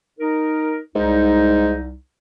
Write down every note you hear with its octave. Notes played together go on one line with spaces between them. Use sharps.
D#4 A#4
C2 G#2 D#4